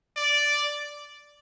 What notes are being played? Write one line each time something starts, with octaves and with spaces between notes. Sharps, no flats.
D5